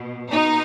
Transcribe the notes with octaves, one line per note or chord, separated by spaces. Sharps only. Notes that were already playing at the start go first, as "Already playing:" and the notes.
Already playing: B2
B2 D#4